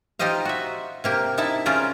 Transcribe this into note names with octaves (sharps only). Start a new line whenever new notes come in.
D#4 F4 G4 C5 D#5 F5
F#4 E5
C3 A#3 G4
D#4 E4 E5 A5
C#4 F4 G#4 C5 D5 A#5